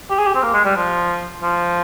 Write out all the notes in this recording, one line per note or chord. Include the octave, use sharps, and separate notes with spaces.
G4
G#4
G4
C4
A#3
G#3
G3
F3
F3